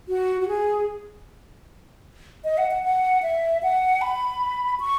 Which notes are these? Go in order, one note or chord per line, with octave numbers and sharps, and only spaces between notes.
F#4
F#4
G#4
D#5
F#5
F#5
F#5
E5
F#5
B5
C#6